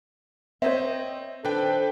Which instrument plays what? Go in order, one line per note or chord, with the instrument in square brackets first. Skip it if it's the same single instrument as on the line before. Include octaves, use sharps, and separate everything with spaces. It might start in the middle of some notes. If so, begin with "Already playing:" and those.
[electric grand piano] C4 D#5 [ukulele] C5 C#5 E5
[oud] D#3 F3 [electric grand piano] D4 B4 G5 [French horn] A4